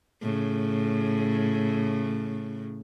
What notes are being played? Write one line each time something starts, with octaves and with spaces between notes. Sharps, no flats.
A2 C#3